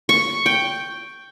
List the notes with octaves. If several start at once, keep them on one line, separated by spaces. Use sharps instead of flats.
C#6
G5